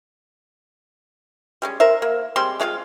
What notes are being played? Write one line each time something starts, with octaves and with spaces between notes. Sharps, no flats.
G3 G#3 C#4
A#4 C5 E5
A#3
G3 G#3 C4 C6
G#3 A3 F4 F5